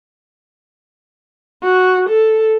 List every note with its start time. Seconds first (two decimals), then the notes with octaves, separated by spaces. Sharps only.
1.63 F#4
2.09 A4